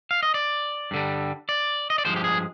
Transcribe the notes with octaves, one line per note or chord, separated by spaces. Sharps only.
F5
D#5
D5
G2 D3 G3
D5
D#5
D5
G2 F3 G#3 C5
G4
G#4